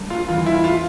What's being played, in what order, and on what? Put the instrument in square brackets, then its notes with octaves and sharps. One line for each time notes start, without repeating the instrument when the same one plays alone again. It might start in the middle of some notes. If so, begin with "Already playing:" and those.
Already playing: [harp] G3 A#3 D4 A4
[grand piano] F4
[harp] E2 E3 G3 C4 [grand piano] F4
[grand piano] E4
F4